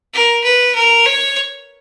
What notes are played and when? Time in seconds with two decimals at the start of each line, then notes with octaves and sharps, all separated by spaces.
0.14 A#4
0.44 B4
0.75 A#4
1.06 C#5